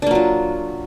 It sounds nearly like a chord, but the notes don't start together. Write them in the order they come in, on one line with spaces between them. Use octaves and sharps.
D4 A#3 F#3 F4